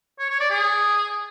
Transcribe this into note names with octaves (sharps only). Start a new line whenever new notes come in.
C#5
C#5
D5
G#4